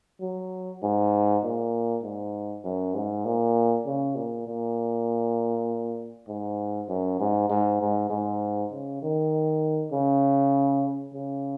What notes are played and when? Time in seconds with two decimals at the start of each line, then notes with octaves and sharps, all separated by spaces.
0.21 F#3
0.83 G#2
1.43 A#2
2.03 G#2
2.64 F#2
2.94 G#2
3.25 A#2
3.86 C#3
4.15 A#2
4.47 A#2
6.28 G#2
6.89 F#2
7.20 G#2
7.49 G#2
7.81 G#2
8.10 G#2
8.72 C#3
9.02 D#3
9.92 C#3
11.14 C#3